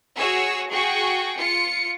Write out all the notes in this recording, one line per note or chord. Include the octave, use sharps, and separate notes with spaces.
F#4 G#4 C#5 E6
F#4 G#4 G5 C#6
F4 C#7